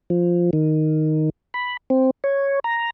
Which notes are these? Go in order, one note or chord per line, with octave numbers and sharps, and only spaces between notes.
F3
D#3
B5
C4
C#5
A#5